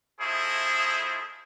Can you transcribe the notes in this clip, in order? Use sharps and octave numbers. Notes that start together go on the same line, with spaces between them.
A3 E4 F4 G#4 C5 D#5